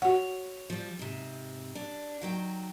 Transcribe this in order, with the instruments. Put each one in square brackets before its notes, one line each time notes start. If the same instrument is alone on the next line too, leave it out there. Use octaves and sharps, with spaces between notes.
[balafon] F#4 F#5 [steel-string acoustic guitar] C#5
[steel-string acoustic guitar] F3 G3
G#2 C3
D4
D#3 F#3 G5